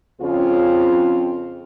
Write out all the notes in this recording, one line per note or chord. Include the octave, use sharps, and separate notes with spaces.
F2 C#3 C4 C#4 F4